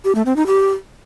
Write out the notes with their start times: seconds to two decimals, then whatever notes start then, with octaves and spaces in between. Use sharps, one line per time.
0.05 G4
0.15 A3
0.26 C4
0.36 D#4
0.47 G4